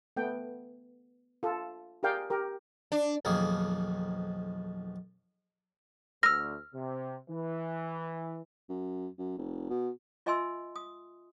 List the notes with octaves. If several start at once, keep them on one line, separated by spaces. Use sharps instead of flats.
A3 B3 G5
F4 A4
G4 G#4 A#4 D5 F5 G5
G4 A#4
D4
B1 F2 D#3 A#3 G#4
D2 E6 F6 A#6
C3
E3
F#2
F#2
F1
B2
F4 D#5 E5 G#5 C6 E6
D#6